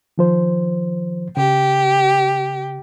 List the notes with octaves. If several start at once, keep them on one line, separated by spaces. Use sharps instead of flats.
D#3 F3 C5
C#3 G4